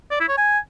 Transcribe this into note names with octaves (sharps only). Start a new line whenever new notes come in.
D5
E4
C#5
G#5